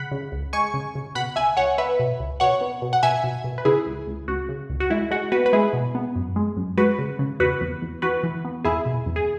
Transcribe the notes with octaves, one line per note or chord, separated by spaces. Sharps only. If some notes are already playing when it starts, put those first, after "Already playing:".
Already playing: C#3 F#5 B5
C#3
C#2
G#3 G#5 C#6
C#3
C#3
B2 F#5 B5
C#2 E5 G#5
C#2 C#5 F#5
B3 B4 E5
B2
C#2
B2 C#5 F#5
B3
B2
F#5
B2 E5 G#5
B2
B2
B4
C#3 E4 G#4
C#2
C#2
C#2 F#4
C#3
C#2
F#4
G#3 E4
G#3 F#4
B3 F#4 B4
B4
G#3 E4 G#4
B2
B3
F#2
G#3
F#2
G#3 F#4 B4
C#3
C#3
E2 F#4 B4
E2
E2
E2 F#4 B4
E3
B3
E2 E4 G#4
B2
E2
G#4